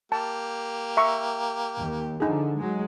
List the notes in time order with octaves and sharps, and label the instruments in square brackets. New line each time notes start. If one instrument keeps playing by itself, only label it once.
[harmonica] A#3 G4 [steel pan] A5
[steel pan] E5 A#5 C#6
[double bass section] D#2
[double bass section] D3 F3 [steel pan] D#4 G#4
[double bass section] F#3 G#3